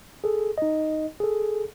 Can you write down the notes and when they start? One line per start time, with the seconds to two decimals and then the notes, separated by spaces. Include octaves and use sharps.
0.24 G#4 A4
0.58 D#4 D#5
1.20 G#4 A4